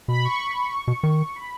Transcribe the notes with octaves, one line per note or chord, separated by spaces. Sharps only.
B2 B5
C#6
B5
C#6
B2
D#3
B5